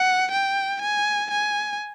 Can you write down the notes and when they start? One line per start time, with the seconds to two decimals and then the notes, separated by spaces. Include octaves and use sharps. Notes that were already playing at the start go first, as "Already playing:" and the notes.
Already playing: F#5
0.32 G5
0.82 G#5
1.31 G#5